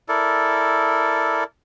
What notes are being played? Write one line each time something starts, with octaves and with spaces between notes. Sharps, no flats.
E4 A4 A#4 D5